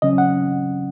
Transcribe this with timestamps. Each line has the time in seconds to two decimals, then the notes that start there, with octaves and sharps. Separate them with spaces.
0.02 C#3 F#3 C#4 D#5
0.18 F#5